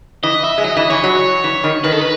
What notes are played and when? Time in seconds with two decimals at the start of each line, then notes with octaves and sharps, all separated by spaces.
0.23 E3 D#5
0.44 E5
0.58 G#3
0.64 F#3 D#5
0.77 E3 D#5
0.90 E3 C#5
1.04 F#3
1.44 E3
1.64 D#3
1.84 D#3 B4
1.92 A4
2.01 B4